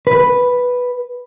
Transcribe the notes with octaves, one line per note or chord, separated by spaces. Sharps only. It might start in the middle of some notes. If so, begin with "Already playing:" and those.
B4